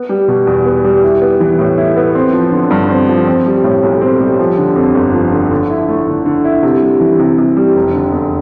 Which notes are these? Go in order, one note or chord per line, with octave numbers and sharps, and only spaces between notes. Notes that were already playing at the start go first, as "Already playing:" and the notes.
Already playing: B3
G3
B2
E2
B3
G3
E4
B3
E3
A2
E4
B3
C4
F3
D3
G2
C4
F3
C4
G3
A2
B1
C4
G3
F3
D3
F2
G1
F3
D3
D3
E4
A3
D3
D3
E4
C3
G3
E3
C3
C3
G3
F1
D3
E2